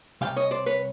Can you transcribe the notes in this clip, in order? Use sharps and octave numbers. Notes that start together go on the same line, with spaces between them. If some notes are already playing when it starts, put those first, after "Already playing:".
C2 C3 F5 G5
C#5 D#5
C5 D5
B4 C#5